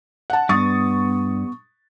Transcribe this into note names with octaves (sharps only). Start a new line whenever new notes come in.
F#5 A5
G2 B3 C#6 D#6 A6